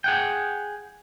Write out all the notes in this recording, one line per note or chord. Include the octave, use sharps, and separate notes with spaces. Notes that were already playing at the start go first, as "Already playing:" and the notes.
G#4 F#5 G5